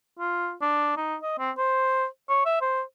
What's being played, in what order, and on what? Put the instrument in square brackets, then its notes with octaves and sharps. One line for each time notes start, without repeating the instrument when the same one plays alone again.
[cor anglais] F4
D4
D#4
D#5
C4
C5
C#5
E5
C5